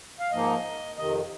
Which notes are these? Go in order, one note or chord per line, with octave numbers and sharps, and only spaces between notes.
F5
G#2 F3 A#3 D#4 D#5
F2 C3 D#3 D#5